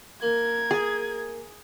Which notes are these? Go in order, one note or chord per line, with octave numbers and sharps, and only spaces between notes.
A#3 A#4 G#6
G#4